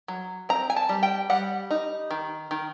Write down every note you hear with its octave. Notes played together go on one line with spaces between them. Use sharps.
F#3
C4 A#5
G#5
A5
G3
G5
G3 F#5
D#4
D#3
D#3